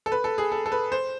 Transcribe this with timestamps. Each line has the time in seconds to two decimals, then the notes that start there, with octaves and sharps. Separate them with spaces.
0.06 A4
0.12 B4
0.24 A4
0.38 G#4
0.52 A4
0.66 A4
0.72 B4
0.92 C5